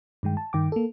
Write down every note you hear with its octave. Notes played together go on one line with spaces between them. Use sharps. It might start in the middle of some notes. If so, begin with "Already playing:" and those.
G2 D#3 G#3 G5
A5
G2 D#3 G5 D6
A#3 A4